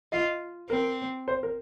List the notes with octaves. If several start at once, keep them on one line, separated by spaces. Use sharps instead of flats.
F4 D#5
C4 A#4
C5
A#4